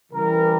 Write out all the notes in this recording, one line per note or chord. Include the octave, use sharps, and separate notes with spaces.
C#3 E3 G3 A#4